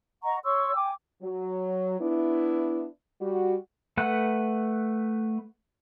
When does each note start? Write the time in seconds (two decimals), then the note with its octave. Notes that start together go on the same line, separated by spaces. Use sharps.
0.23 D#5 F#5 A#5 C#6
0.44 C#5 C6 C#6 E6
0.74 G5 G#5 D6
1.22 F#3
2.00 B3 D4 E4
3.21 G3 F#4
3.97 A3 B4 F#5